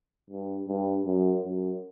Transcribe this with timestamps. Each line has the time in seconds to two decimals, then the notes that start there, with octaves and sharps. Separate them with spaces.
0.30 G2
0.68 G2
1.06 F#2
1.44 F#2